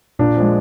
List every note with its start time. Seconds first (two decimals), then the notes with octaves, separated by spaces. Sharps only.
0.19 A#2 D4
0.37 F3 G#3